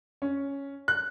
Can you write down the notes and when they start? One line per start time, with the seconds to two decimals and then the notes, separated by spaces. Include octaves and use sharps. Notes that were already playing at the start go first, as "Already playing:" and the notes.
0.22 C#4
0.88 F#6